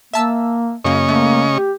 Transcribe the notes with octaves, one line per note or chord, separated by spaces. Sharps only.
A#3 E5 A5 E6
F#2 C#3 A#3 D#5 C#6
A3 A#3
G4